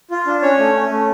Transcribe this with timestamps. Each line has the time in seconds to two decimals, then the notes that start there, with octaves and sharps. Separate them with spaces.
0.11 F4
0.27 D4
0.42 C#4 C#5
0.59 A3
0.75 C#4
0.90 A3